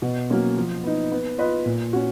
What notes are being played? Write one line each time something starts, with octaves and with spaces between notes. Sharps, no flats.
B2
F#3 A#3 C#4
F3
B3 D#4
B3
F4 B4 D#5
A#2
C#4 F#4